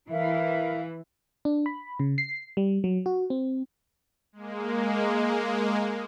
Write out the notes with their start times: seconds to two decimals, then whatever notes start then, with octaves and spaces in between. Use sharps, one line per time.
0.10 E3 A#4 E5 F5
1.45 D4
1.66 B5
2.00 C#3
2.18 C7
2.57 G3
2.84 F#3
3.06 F#4
3.30 C4
4.33 G#3 A#3